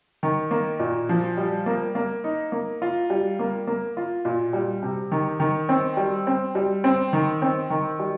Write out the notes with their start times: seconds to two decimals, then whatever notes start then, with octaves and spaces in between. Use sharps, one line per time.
0.23 D#3
0.51 A#3
0.79 A#2
1.09 F3
1.37 G3
1.66 A#3
1.95 A#3
2.24 D#4
2.52 A#3
2.82 F4
3.10 G3
3.39 A#3
3.67 A#3
3.97 F4
4.25 A#2
4.53 G3
4.83 C3
5.12 D#3
5.40 D#3
5.69 C4
5.97 G3
6.27 C4
6.55 G3
6.84 C4
7.13 D#3
7.42 C4
7.70 D#3
7.99 G3